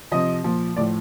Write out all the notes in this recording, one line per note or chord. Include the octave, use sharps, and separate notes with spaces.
C3 F3 D#5
A#2 F3
A2 F3 D5